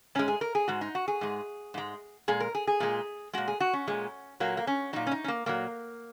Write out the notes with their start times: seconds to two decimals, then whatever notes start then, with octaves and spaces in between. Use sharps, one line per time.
0.15 G#2 G#3 C#4
0.28 G#4
0.41 A#4
0.55 G#4
0.68 G#2 G#3 F#4
0.81 D#4
0.95 F#4
1.08 G#4
1.21 G#2 G#3
1.74 G#2 G#3
2.28 A#2 G#3 G#4
2.40 A#4
2.55 G#4
2.67 G#4
2.80 A#2 G#3
3.33 A#2 G#3 F#4
3.48 G#4
3.60 F#4
3.73 C#4
3.87 A#2 G#3
4.40 A#2 F#3 A#3
4.57 A#3
4.67 C#4
4.93 A#2 F#3 D#4
5.07 C#4
5.12 D#4
5.24 C#4
5.28 A#3
5.46 A#2 F#3 A#3